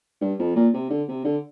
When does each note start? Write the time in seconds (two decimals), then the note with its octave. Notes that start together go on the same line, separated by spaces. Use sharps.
0.21 G2
0.39 F2
0.56 A#2
0.74 C3
0.90 D3
1.08 C3
1.24 D3